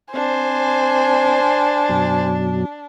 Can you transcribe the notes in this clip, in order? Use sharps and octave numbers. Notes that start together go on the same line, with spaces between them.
C4 D4 C5 G#5
F#2 B2 F#3